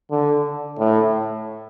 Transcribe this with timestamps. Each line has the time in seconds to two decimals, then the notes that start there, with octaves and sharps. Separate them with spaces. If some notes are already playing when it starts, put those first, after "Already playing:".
0.11 D3
0.78 A2